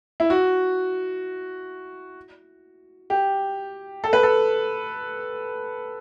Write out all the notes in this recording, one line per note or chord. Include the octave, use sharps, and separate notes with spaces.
E4
F#4
G4
A4
B4
A4